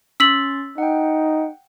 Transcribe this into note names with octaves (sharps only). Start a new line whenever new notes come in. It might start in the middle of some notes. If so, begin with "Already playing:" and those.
C#4 C6 E6 A6 B6 F#7
D#4 F#5 G5